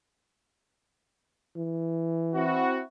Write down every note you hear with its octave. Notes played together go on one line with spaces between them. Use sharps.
E3
C4 E4 F#4